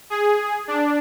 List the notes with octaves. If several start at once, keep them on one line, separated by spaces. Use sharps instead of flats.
G#4
D4